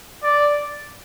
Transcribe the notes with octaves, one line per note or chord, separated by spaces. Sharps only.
D5